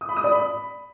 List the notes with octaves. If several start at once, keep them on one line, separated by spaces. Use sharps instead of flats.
D#6
B5
D#6
D5
B5